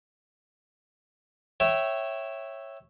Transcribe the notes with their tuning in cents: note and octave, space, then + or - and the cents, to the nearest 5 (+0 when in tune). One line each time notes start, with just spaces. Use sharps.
C#5 -10 E5 +0 G5 -20